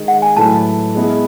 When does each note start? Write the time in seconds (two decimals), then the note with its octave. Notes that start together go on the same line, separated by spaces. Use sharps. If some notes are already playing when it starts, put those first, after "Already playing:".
Already playing: D#3 G#3 D#4
0.08 F#5
0.22 G#5
0.36 A2 F#3 A3 E4 B4 A5
0.95 G#3 B3 E4 G#4 D#5